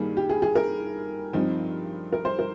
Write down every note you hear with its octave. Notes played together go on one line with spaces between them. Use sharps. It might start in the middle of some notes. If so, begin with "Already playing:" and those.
Already playing: G2 D#3 G3 A#3 G#4
G4
G#4
G#4
A#4
G2 F3 C4 D#4
A#4
C5
A#4